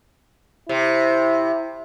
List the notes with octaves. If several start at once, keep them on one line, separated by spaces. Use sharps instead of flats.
C3 E4